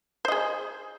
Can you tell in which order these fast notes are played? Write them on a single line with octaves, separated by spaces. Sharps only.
C5 D#5 G#4